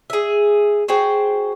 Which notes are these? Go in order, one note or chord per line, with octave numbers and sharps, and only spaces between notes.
G#4 E5
F#4 G#4 C5 G5